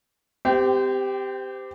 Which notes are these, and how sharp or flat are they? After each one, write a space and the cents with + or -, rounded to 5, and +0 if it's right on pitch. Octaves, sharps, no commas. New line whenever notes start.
C4 -30 G4 +5